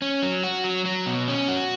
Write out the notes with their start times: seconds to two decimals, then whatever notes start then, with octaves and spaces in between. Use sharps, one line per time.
0.02 C#4
0.22 F#3
0.44 F#4
0.64 F#3
0.85 F#3
1.06 B2
1.28 C#4
1.48 F#4